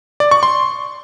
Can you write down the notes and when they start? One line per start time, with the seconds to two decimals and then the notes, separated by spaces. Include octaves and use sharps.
0.20 D5
0.31 C#6
0.43 C6